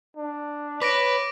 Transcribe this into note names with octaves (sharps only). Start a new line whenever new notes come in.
D4
B4 C#5 D6 A#6 D7